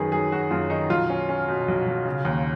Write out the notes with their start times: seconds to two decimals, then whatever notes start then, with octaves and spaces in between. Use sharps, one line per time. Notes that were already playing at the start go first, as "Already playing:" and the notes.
Already playing: F#2 D#3 G#4 B4
0.12 F#3 G#4
0.31 F#3 F#4
0.51 F#2 F4
0.70 D#3 D#4
0.89 B1 F4
1.10 C#4
1.29 C#4
1.48 B2
1.68 B1
1.86 B1
2.05 C#3
2.25 D#2